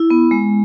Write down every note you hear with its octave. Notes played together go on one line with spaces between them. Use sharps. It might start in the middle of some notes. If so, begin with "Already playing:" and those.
Already playing: E4
B3
G#3